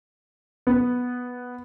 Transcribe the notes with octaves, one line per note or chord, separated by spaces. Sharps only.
B3